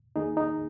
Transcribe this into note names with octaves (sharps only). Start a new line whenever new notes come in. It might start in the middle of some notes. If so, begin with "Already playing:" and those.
D#2 D#3 A#3 D#4 G#4
D#4